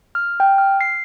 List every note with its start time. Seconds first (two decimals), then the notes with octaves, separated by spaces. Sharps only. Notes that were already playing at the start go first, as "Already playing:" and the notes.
0.15 F6
0.40 G5
0.58 F6
0.81 C7